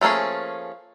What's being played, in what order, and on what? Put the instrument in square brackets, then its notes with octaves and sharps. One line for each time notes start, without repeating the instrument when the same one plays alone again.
[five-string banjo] F3 A3 A#3 C#4 G#4